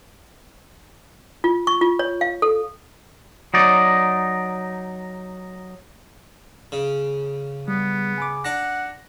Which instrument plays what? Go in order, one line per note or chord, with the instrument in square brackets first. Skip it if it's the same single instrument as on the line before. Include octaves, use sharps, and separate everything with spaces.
[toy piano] F4
C#6
F4
C#5
F5
A4
[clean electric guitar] F#3 D#4 D5
[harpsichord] C#3
[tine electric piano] G3 [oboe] B3
[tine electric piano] G#5 B5 D6
[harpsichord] D4 A5 [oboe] F#5 [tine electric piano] A#6